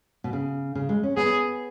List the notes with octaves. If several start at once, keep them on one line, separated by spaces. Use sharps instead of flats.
B2
C#3
C#3
G#3
C#4
B3 G#4